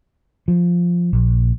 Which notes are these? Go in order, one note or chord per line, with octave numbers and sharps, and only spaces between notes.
F3
A#1